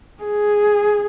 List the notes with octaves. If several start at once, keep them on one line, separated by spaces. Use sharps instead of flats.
G#4